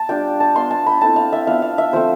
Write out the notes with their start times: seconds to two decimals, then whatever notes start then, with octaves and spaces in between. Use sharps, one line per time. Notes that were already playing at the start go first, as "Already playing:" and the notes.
Already playing: A5
0.09 G3 D4 F4 G5
0.40 A5
0.55 B3 F4 C6
0.71 A5
0.86 B5
1.01 A3 C4 E4 A5
1.16 F5
1.33 E5
1.47 B3 D4 F4 F5
1.62 F5
1.78 E5
1.93 F3 A3 C4 C5